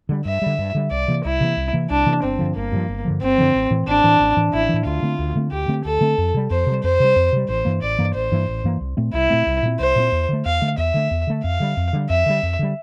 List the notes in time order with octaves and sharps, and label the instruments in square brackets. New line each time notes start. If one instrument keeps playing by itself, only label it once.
[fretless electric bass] D3 G3
[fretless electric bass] G2 [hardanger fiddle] E5
[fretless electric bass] D3 G3
G2
D3 G3
[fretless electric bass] C2 [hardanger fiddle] D5
[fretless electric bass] C3 E3 A#3
[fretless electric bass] C2 [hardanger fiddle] E4
[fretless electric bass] C3 E3 A#3
C2
C3 E3 A#3
[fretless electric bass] C2 [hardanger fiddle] D4
[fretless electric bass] C3 E3 A#3
[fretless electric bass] G1 [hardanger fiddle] C4
[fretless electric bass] G2 D3 F3
[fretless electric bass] G1 [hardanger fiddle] A#3
[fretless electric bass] G2 D3 F3
G1
G2 D3 F3
[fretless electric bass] G1 [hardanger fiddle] C4
[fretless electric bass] G2 D3 F3
A1
A2 E3
[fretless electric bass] A1 [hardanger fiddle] D4
[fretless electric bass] A2 E3
A1
A2 E3
[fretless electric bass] A1 [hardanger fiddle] E4
[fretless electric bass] A2 E3
[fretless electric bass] D2 [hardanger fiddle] F4
[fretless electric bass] D3 A3 C4
D2
D3 A3 C4
[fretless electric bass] D2 [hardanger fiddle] G4
[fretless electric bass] D3 A3 C4
[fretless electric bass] D2 [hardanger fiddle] A4
[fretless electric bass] D3 A3 C4
F2
C3 G3
[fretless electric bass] F2 [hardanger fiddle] C5
[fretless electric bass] C3
G3
[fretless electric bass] F2 [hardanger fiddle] C5
[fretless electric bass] C3 G3
F2
C3 G3
[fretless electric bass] A1 [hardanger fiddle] C5
[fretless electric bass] G2 E3 A#3
[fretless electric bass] A1 [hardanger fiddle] D5
[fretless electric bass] G2 E3 A#3
[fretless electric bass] A1 [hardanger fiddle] C5
[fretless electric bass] G2 E3 A#3
A1
G2 E3 A#3
C2
A#2 A3 C4
[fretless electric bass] C2 [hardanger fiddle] E4
[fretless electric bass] A#2 A3 C4
C2
A#2 A3 C4
[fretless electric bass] C2 [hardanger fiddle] C5
[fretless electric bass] A#2 A3 C4
E2
D3 A3
[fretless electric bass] E2 [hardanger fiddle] F5
[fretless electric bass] D3 A3
[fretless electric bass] E2 [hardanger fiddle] E5
[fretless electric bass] D3 A3
E2
D3 A3
[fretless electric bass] F2 [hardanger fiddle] F5
[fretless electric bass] D3 G3
F2
D3 G3
[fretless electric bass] F2 [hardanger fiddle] E5
[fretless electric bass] D3 G3
F2
D3 G3